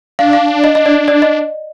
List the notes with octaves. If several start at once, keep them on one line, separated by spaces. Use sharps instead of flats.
D4 F5
F5
D#5
D#5
D5
D5
D#5